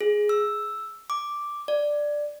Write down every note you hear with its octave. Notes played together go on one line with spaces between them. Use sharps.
G#4
E6
D6
D5